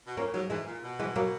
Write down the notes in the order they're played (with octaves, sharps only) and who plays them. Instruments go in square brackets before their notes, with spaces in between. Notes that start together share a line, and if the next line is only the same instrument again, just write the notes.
[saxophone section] B2
[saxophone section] A#2 [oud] A#3 C#4
[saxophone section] G#2 [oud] F#3
[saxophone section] G#2 [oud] E3 G#3
[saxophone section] A#2
B2
[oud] E3 G#3
F#3 A#3